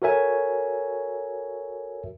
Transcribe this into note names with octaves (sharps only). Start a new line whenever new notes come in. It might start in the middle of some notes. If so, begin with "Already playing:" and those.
F#4 A4 A#4 C#5 E5 G#5